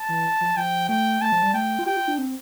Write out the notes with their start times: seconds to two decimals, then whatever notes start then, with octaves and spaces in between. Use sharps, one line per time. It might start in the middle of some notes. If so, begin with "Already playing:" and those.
Already playing: A5
0.09 E3
0.41 F3
0.57 F3 G5
0.89 A3 G5
1.22 A3 A5
1.32 F3
1.43 G3
1.54 A3 G5
1.79 F4
1.86 G4 G5
1.97 F4
2.08 D4
2.18 C4